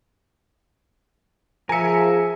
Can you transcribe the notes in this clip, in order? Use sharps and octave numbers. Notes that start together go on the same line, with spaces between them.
F3 G#4 A#4 E5 G#5 C#7